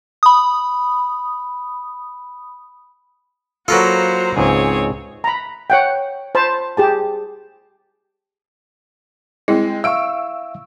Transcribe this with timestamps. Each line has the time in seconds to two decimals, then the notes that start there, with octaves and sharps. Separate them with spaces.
0.23 B5 D#6
3.68 F#3 A#3 F4 F#4 A4 B4 C5 A#5
4.37 C#2 G#2 C4 G#4 C#5
5.24 A#5 B5
5.70 C#5 F#5 G5
6.35 C5 A5 B5
6.77 G4 G#4 A5
9.48 G#3 C4 E4
9.84 E5 F5 C#6 E6 D7